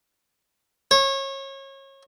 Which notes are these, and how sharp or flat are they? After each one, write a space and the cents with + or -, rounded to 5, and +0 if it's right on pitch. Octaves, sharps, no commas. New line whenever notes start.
C#5 -30